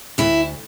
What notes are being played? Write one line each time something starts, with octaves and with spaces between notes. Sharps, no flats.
D2 E4